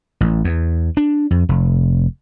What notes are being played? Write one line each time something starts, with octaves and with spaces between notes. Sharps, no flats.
A1
E2
D4
F2
F1